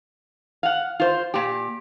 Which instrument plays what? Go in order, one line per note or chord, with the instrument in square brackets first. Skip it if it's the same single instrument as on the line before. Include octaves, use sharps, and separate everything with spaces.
[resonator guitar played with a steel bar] F5 F#5
F4 C5
A#2 G4